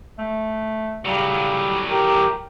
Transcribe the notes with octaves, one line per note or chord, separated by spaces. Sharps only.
A3
A2 C#3 F#3 G3
G4 A#4